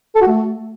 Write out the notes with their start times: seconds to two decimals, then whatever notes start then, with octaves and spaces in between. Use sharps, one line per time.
0.15 A4
0.21 F#4
0.28 A3